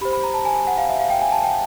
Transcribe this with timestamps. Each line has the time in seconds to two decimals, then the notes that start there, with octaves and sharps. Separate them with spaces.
0.01 G4 B5
0.05 C5
0.13 B5
0.23 A#5
0.34 A5
0.45 G#5
0.56 G#5
0.67 F#5
0.78 F5
0.89 E5
0.99 F5
1.10 G5
1.21 G#5
1.32 A5
1.43 G5